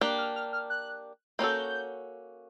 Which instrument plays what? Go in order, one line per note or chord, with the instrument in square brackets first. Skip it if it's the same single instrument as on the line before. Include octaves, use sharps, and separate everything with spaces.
[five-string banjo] A#3 D4 G4 [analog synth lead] F#6
[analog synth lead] F6
F6
F6
F#6
[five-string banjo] A#3 C#4 F#4 A4 [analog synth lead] G6